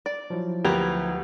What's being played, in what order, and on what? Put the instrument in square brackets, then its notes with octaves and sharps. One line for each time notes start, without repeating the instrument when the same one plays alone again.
[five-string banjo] D5
[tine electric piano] F3 F#3 E4
[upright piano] D2 G#6 F7 [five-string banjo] A#3 B3 [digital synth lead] G4